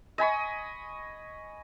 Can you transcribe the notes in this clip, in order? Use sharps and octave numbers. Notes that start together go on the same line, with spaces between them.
D#5 G#5 B5 C#6